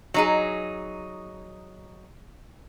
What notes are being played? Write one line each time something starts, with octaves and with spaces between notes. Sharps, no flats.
F#3 D#4 G#4